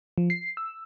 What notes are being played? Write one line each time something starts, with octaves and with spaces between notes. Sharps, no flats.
F3
C7
E6